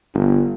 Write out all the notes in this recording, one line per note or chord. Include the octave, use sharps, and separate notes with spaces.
G1